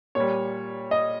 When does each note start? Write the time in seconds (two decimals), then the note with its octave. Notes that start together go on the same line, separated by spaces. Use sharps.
0.15 A#2 G3 C#5
0.91 D#5